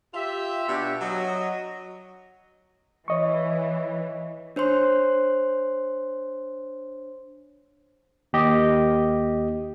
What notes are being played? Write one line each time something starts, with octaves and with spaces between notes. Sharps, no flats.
F4 G4 E5
B2 D4 G4
F#3 D#5
E3 C#5 D#5 C#6
D4 C5 C#5 C6
D#2 G4 D#5